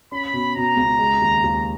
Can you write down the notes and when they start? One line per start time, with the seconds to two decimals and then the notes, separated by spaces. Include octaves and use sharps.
0.11 C#4 B5
0.33 B2
0.56 B2 A#5
0.77 C#2
0.99 G#3
1.21 D#2
1.43 D#2